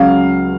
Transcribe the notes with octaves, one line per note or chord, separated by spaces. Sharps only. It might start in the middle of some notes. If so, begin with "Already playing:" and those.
Already playing: C#2 C#3 F#3 F5